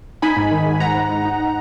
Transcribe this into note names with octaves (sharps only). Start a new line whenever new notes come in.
D#4 G#5 B5
G#2
D#3
G#2
G#2 F#5 A#5
G#2
D#4
D#4
D#4